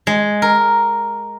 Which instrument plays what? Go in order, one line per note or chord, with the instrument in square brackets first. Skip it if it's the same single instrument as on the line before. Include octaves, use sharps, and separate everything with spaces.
[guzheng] G#3
A#4